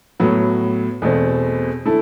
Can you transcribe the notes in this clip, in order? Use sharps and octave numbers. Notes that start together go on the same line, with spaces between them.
A2 F#3 B3
E2 B2 A3 C4
D3 A3 E4 A4